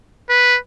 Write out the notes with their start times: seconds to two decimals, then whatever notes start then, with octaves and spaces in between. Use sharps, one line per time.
0.29 B4